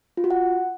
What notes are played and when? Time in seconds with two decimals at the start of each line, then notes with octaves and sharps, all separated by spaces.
0.17 F4
0.24 F#4
0.31 F#5